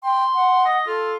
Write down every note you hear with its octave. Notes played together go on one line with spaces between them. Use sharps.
G5 C6
F#5
D#5
F4 A4